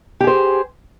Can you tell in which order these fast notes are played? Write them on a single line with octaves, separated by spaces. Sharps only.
G4 G#4 C5